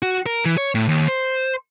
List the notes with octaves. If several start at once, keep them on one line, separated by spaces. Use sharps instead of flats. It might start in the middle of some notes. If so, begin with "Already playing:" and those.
F#4
A#4
E3
C#5
A2
D#2
C5